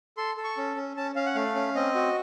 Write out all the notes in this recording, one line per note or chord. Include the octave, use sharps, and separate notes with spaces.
A4 C6
A4
C#6
C#4
C#4
C#4 A5
C#4 F5
F#5
A3 F5
C#4
C4 D#5
F#4